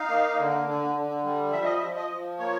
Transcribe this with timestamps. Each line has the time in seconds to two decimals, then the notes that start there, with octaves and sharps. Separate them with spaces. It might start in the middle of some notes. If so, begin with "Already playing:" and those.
Already playing: D#4 F5
0.09 A#3
0.39 D3
0.66 D3
0.95 D3
1.24 G3
1.52 F3 E5
1.64 D#5
1.77 E5
1.81 F3
1.96 D#5
2.11 F3
2.39 A#3 C#5